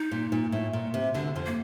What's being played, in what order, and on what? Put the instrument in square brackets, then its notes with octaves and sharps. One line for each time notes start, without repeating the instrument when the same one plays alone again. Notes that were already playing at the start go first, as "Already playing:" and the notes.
Already playing: [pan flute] D#4
[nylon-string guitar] A#2
A#2
A2
A#2
C3
[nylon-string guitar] D2 D3 [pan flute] D4
[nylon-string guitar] F2 F3
[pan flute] A#3